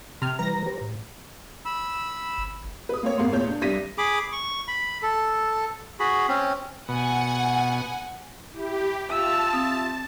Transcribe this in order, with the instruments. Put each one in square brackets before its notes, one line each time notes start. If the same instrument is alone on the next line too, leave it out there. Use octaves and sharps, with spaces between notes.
[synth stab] C3 F6
[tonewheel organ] E3 G3 B4 [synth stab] A#5 A#6
[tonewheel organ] G4 B4 C5
A2
[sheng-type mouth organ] B5 E6
[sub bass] G1
[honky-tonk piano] B4 D#6
A#3 C4 C#5
G#1 A#3 B3 C6
E2 A#2 C#5 G6
D4
C2 G2 D5 A#6 B6 D#7
[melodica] G#4 B5 D6
C#6
B5
A4
F#4 G#4 B5
C4 C#4
[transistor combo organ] B2 [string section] F#5 G#5
[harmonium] E4 [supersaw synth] G4
[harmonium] F4 E5 [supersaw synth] A5 [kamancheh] E6 F6
[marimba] C4 D#6